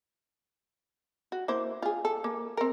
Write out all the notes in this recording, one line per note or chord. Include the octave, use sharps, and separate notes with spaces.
F#4
A#3 E4 C5
F4 G#4
A4
A#3
C4 A#4